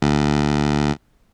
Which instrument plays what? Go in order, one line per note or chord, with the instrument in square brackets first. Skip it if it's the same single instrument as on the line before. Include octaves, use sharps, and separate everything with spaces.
[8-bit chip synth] D2